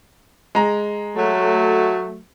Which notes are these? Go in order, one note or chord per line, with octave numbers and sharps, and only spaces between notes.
G#3 A#5
F#3 A3